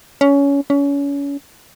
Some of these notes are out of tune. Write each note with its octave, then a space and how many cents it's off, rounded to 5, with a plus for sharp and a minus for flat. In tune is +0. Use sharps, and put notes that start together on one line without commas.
C#4 +20
C#4 +30